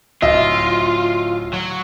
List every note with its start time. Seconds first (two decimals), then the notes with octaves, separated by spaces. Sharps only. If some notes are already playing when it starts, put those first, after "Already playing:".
0.22 D1 F4 D#5 E5
1.53 F#3